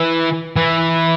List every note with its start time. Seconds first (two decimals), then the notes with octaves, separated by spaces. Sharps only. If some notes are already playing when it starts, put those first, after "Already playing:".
Already playing: E3
0.56 E3